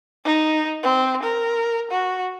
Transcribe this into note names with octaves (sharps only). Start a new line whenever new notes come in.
D#4
C4
A#4
F#4